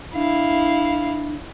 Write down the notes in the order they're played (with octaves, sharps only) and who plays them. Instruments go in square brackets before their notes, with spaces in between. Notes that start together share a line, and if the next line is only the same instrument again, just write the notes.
[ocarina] D4 [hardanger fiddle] E4 F5